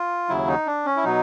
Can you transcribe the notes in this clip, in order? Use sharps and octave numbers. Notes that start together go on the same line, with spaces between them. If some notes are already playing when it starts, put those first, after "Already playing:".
Already playing: F4
D#2 C#3 F#3 E4
D#4
D4
C#4
E4
B2 F#3 D#4